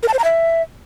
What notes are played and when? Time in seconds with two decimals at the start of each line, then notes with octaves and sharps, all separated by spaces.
0.03 A#4
0.08 A5
0.14 C5
0.19 A#5
0.24 E5